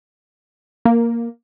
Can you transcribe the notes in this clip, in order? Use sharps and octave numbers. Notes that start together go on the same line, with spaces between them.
A#3